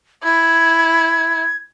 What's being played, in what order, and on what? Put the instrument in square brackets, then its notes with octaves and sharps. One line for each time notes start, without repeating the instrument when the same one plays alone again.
[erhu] E4 [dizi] G#6